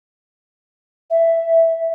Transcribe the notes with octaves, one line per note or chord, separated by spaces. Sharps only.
E5